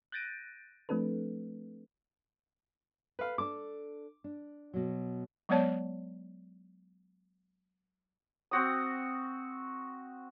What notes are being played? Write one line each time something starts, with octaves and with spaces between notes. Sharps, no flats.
F#6 G6 A6 A#6 D7 D#7
F3 A3 C4 D4 A4 B4
A4 B4 F5
D4 A4 D6
D4
B2 F#3
F#3 G#3 B3 C#5 D5 A5
C4 F#4 D#6